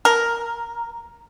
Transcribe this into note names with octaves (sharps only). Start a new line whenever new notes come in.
A#4